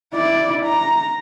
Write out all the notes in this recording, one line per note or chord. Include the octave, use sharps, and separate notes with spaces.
E4 D5
A#5